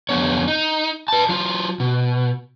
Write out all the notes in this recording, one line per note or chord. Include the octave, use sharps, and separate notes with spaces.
F2 D3 B3 C#5
D#4
B4 A5
F#3 F4
B2